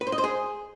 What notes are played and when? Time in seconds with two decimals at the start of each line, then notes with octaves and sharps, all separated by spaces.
0.01 B4
0.07 C5
0.12 D#5
0.18 C5
0.24 G#4